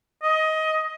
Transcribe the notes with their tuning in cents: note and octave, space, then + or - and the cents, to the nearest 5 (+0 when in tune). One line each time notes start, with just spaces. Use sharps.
D#5 +20